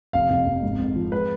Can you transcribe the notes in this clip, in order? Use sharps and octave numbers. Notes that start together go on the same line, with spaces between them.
F1 F5
F2
F2
G#1
G#1
F3
G#3 B4